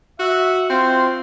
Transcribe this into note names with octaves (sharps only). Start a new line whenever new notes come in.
F#4 E5
C4 F4